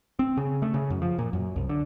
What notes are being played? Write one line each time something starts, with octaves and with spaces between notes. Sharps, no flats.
C4
C#3
A3
C#3
F#2
F3
A#2
F#2
C2
D3